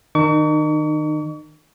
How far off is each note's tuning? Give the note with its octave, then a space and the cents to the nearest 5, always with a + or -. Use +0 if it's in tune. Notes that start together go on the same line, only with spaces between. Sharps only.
D#3 -5 D#4 -35 C#6 +40